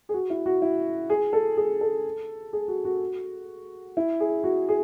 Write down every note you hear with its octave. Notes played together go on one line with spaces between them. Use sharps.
G#4
F#4
E4
F#4
E4
G#4
A4
G#4
A4
G#4
F#4
F#4
E4
G#4
F#4
G#4